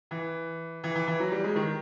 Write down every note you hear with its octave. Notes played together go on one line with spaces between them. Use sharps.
E3
E3
E3
E3
F#3
G3
G#3
D#3